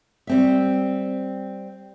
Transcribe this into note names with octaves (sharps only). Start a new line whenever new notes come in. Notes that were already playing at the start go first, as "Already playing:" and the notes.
G3 C4 E5